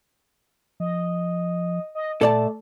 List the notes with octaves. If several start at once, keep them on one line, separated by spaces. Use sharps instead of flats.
F3 D#5
D#5
A#2 A3 A4 D5 A5